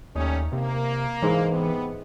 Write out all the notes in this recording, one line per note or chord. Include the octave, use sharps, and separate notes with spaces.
D#2 G3 A3 C#4 D#4
C3 A#3
G#2 E3 G#3
C3 B3